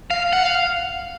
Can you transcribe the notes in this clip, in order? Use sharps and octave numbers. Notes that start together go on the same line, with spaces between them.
F5
F#5
F5